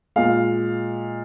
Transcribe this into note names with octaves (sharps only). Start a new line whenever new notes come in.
A#2 G#3 F5